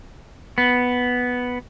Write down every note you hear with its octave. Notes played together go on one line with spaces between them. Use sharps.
B3